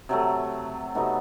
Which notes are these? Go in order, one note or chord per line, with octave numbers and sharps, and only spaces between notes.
C3 F#3 A3
C3 F#3 A3 B3 D#4